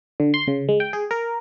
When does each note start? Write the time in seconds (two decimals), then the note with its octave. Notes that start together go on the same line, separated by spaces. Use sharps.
0.20 D3
0.34 C6
0.48 C#3
0.69 G#3
0.80 G5
0.93 G#4
1.11 A#4